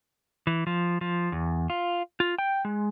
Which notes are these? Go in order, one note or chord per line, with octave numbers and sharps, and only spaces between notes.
E3
F3
F3
E2
F4
F4
G5
G#3